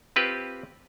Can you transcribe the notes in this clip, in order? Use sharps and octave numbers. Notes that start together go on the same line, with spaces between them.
C4 F4 G4 B4